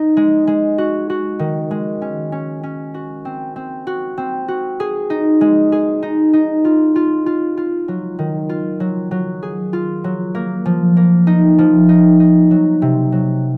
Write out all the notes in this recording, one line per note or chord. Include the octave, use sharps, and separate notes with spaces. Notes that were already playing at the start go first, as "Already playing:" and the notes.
Already playing: D#4
G#3
G#3
F#4
F#4
D#3
G#3
C#4
C#4
C#4
F#4
C4
C4
F#4
C4
F#4
G#4
D#4
G#3
G#4
D#4
D#4
F4
F4
F4
F4
F#3
D#3
F4
F#3
F#3
G#4
F4
F#3
A#3
F3
A#3
D#4
F3
D#4
D#4
F#3
C3
F#3